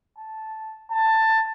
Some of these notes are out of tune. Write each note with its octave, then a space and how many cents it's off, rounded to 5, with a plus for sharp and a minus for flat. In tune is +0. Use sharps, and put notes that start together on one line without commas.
A5 -5
A5 +15